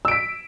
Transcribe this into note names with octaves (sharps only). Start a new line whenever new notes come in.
E6 B6 D7